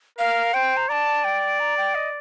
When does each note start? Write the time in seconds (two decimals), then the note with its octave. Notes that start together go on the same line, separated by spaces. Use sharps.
0.18 A#4 F5
0.54 C5 G5
0.77 A#5
0.89 D5 A5 A#5
1.24 G5
1.60 A#5
1.77 G5
1.95 D#5